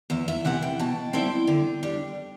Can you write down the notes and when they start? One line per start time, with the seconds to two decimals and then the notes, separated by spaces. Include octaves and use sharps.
0.10 E2 E5
0.28 E5
0.45 C3 E3 B3 F#5
0.62 G5
0.80 B2 A5
1.13 G3 C4 E4 G5
1.47 D3
1.83 G3 D4